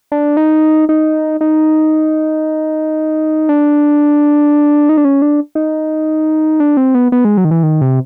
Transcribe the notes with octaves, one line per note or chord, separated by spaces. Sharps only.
D4
D#4
D#4
D#4
D4
D#4
D4
C#4
D4
D#4
D4
C4
B3
B3
G#3
F#3
D#3
E3
D#3
C3